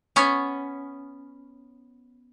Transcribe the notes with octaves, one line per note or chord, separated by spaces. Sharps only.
B3 C#4 C#5